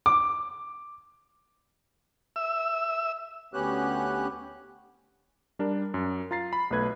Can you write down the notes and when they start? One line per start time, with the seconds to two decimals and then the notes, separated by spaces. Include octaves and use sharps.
0.06 D6
2.36 E5 E6
3.54 D2 B3 C#4 G4 F#6
5.59 G3 D4 A#4
5.94 F#2
6.31 F4 A#5 A6 C7
6.53 B5
6.71 B1 A3 B4 G#6